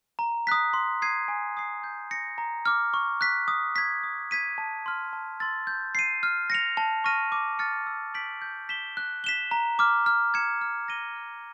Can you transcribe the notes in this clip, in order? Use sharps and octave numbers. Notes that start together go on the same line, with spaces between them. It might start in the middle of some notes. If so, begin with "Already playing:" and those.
A#5
D#6 F#6 B6
C6
D#6 G#6 C7 D#7
G#5
C6 D#6 G#6 C7
G6
A#6 C#7
A#5
D6 F6
C#6
F#6 B6
D#6
G#6 B6
D#6
G#6 B6 D#7
A5
C6 F6
A5
C6 E6 A6
G6
C7 D#7
F6
A#6 C#7 F7
A5
C#6 F6 A#6 D#7
D6
F6 A6 C#7
E6
G6 B6 D7 F#7
G6
B6 E7 G7
F#6
B6 E7 G7
A#5
D6 F6
F6
G#6 C#7 E7
F6
A#6 D#7 G7
F6